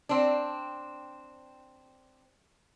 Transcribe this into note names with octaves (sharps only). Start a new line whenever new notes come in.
C4 D4